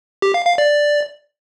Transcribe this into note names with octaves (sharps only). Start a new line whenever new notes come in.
G4
F5
F5
D5